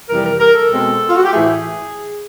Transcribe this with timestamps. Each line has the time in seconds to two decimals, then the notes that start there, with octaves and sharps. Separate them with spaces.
0.09 F2 C3 E3 G3 A#4
0.25 A#4
0.40 A#4
0.55 A4
0.70 B2 G#3 C4
1.09 F4
1.16 F#4
1.23 G4
1.31 A2 E3 A3 G#4